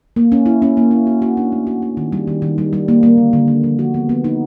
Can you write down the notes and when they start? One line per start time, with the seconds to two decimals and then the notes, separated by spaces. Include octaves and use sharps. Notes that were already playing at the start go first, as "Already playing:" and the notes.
0.16 A#3
0.32 C#4
0.46 E4
0.62 C#4
0.77 A#3
0.91 E4
1.07 F#4
1.22 F#4
1.37 D4
1.52 A3
1.67 F#4
1.82 F#4
1.97 D#3
2.12 G3
2.28 D#3
2.42 D#3
2.58 G3
2.73 G3
2.88 A#3
3.03 A#3
3.17 D3
3.33 D3
3.48 A#3
3.64 F3
3.79 F#4
3.94 B3
4.09 B3
4.24 D#4